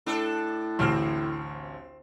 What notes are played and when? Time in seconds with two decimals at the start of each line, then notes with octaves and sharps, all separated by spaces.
0.06 A2 D4 A4
0.79 A1 D2 C4 F6